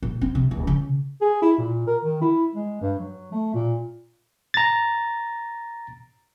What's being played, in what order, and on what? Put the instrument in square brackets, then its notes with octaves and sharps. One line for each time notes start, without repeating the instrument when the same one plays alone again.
[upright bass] A#2
C4
C3
D1
C#3
[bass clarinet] G#4
E4
A#2
A#4
D#3
E4
G#3
G2
F#3
A3
A#2
[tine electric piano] A#5 A6